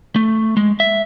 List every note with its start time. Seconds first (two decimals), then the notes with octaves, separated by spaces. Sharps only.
0.16 A3
0.57 G#3
0.80 E5